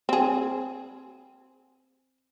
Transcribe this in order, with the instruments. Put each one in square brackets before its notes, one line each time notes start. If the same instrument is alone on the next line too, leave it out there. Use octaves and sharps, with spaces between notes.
[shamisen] C4 G#4